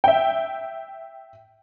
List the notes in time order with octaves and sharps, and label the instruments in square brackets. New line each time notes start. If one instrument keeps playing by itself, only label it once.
[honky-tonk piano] E5 G5